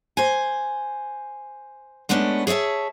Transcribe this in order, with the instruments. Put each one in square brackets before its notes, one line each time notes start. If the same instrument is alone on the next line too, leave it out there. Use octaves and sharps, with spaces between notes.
[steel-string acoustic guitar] C5 G#5
G#3 A3 B3 C#4 D4
G#4 C#5 D5 E5 A5